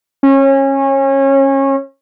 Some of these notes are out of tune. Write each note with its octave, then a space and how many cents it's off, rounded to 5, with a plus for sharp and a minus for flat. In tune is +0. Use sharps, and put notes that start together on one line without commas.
C#4 -25